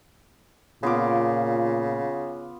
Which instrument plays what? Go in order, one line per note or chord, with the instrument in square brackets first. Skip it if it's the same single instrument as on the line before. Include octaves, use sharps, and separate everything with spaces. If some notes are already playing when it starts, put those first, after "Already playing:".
[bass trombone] A#2 [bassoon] C#3 [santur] B3 F4 D6